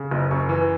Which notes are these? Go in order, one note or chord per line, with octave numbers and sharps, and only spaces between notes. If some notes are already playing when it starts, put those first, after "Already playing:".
Already playing: C#3
F#1
F#2 C#6
E3